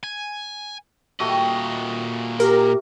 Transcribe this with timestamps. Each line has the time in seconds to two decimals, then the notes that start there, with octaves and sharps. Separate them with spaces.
0.04 G#5
1.20 A#2 G3 A3 F#4 D#5
2.40 G4 A#4